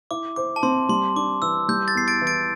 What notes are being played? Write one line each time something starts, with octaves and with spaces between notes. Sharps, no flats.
E4 D6
C5 D6
A5
C4 C6
G3 C6
D4 D6
E3 E6
G3 G6
A6
E2 C7
A6 D7
E3
A6 D7